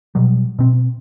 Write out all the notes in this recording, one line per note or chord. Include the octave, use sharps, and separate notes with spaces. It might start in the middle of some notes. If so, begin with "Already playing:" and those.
B2 F#3 G3
B2 C4